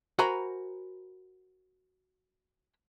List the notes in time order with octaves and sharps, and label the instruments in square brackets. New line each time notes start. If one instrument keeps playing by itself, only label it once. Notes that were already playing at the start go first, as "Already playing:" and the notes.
[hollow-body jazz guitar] F#4 A#4 C5 G#5 A#5 B5